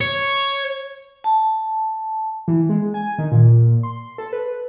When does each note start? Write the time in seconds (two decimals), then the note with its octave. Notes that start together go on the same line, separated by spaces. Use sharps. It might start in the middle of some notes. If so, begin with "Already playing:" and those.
0.01 C#5
1.24 A5
2.48 E3
2.69 G#3
2.94 G#5
3.18 D#3
3.32 A#2
3.83 C6
4.18 A4
4.33 B4